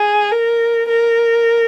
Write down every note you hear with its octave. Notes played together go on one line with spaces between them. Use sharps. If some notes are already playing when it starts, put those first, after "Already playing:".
Already playing: G#4
A#4
A#4